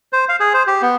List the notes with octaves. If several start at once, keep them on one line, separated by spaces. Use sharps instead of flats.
C5
F5
G#4
C5
G4
B3